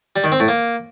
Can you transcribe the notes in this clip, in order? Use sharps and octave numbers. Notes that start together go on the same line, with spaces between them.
G3
D#3
C4
A2
A#3